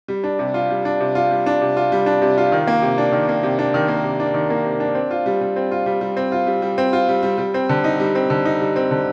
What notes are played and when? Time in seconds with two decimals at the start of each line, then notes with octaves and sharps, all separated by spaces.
0.08 G3
0.24 D4
0.39 C3
0.54 F4
0.70 G3
0.85 D4
1.00 C3
1.15 F4
1.31 G3
1.46 D4
1.62 C3
1.77 F4
1.92 G3
2.06 D4
2.22 C3
2.38 F4
2.52 D#3
2.67 A#3
2.82 C3
2.98 D4
3.12 D#3
3.29 A#3
3.43 C3
3.59 D4
3.74 D#3
3.88 A#3
4.04 C3
4.20 D4
4.34 D#3
4.50 A#3
4.65 C3
4.80 D4
4.95 C4
5.11 F4
5.26 G3
5.41 G3
5.56 C4
5.71 F4
5.86 G3
6.01 G3
6.17 C4
6.32 F4
6.47 G3
6.62 G3
6.78 C4
6.93 F4
7.08 G3
7.23 G3
7.38 G3
7.54 C4
7.69 D3
7.84 D#4
8.00 G3
8.15 C4
8.30 D3
8.45 D#4
8.60 G3
8.76 C4
8.91 D3